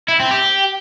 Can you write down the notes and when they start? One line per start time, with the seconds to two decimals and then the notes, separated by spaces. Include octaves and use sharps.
0.08 E4
0.20 C4
0.31 G4